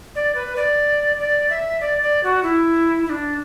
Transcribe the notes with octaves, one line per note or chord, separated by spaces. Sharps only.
D5
B4
D5
D5
E5
D5
D5
F#4
E4
E4
D4